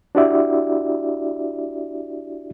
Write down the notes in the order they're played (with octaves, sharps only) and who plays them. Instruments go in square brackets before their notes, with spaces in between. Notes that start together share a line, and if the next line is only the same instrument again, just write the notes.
[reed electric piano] D4 E4 F#4 G4 D5 E5